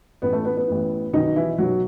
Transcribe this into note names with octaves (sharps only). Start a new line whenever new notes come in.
A1 A2 E3 B3
A3
B3
B3
A1 A2 E3
B1 B2 D#3 D#4
E3 E4
B1 B2 F#3 F#4